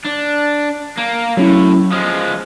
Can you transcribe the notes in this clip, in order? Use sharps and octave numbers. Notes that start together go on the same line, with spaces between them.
D4
A#3
A2 F#3 C#4 E4
F3 G#3 D#6 F6